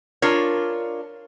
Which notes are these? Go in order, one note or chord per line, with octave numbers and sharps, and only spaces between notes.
D4 F4 A#4 C#5